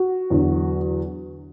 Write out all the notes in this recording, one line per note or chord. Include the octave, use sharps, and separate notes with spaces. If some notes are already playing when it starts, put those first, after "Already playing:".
Already playing: F#4
E2 D3 F#3